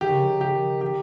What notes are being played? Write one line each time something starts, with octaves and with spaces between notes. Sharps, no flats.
D#3 G4
C#3
D#3
D#3
G4
D#3
D#3 G4